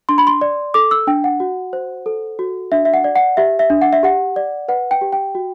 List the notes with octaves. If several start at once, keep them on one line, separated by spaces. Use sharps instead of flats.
D4 C6
B5
C6
D5
A4 D6
E6
D4 G5
F#5
F#4
C5
A4
F#4
D4 E5
E5
F#5
D5
F#5
G4 E5
E5
D4
F#5
E5
G4 F#5
D5
B4 F#5
G5
G4
G5
F#4